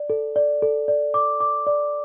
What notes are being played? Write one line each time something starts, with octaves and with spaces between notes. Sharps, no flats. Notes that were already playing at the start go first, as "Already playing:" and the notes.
Already playing: D5
A4
D5
A4
D5
D6
D6
D5